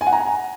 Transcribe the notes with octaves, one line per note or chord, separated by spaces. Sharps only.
G#5
F#5
A#5